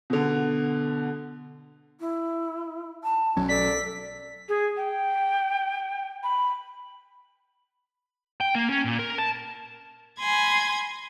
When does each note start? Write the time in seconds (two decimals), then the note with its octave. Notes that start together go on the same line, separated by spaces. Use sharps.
0.10 B2 D3
2.00 E4
3.04 A5
3.37 B1 F#3 C#4
3.49 A4 D5 B6
4.49 G#4
4.77 G5
6.23 B5
8.41 G5
8.55 A#3
8.70 C#4
8.85 A#2
8.99 A#4
9.18 A5
10.19 G#5 B5 C6 G#6 A#6